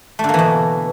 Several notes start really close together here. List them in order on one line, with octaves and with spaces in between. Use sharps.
A3 D3 A#3 E3 B2